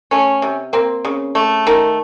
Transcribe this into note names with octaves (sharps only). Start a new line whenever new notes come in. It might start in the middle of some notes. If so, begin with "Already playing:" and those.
A3 C#4
C3
A#3 C4
C#3
A3
D#3